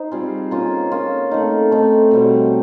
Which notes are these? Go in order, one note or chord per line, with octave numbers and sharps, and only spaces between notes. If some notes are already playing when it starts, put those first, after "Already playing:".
Already playing: D#4 C5
G3 C4 F4 G#4
A#3 C#4 F4
A#3 C#4 F4
A3 C4 D#4
A3 C4 D#4
B2 G3 C4